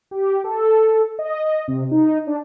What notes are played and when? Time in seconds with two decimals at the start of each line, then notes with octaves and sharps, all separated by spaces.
0.11 G4
0.44 A4
1.19 D#5
1.68 C3
1.91 D#4
2.27 D4